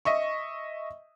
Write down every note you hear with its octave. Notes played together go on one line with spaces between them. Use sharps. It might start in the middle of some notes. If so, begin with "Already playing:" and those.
D#5 E5 C#6